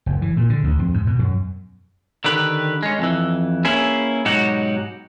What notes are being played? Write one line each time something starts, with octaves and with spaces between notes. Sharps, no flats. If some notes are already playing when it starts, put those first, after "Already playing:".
F#1
E3
A#2
D3
D2
F2
G#2
B2
F#2
D3 D#3 G4 B4
G#3 C#4
F2 E3
A#3 C#4 E4 G#4 B4
G#2 B2 F#3 D#4 F#4 G4